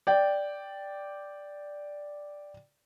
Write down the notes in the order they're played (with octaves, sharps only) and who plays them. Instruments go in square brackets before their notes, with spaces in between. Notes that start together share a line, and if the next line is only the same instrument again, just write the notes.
[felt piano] D5 G5